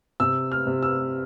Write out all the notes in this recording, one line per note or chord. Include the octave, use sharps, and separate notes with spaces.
C3 E6
F6
C3
E6